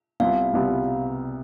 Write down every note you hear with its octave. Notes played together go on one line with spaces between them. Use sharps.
C2 C3 G3 B3 F4 F5
C2 C3 G3 B3 F4